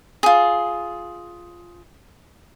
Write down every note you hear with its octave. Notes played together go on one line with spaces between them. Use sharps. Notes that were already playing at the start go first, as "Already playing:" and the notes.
F4 G#4